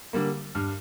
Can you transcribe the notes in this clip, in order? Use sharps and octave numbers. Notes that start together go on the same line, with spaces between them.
D3 G3 A#3
G2 F6